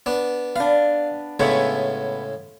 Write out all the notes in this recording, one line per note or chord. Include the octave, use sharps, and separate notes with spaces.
B3 D4
B3 D4 F5
A2 C#3 G#3 B3 E4 C#5